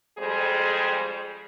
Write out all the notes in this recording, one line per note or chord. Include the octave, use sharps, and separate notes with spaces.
F2 G3 G#3 G#4 A4 C5